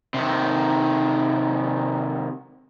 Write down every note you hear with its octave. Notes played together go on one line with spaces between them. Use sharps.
C3 D#3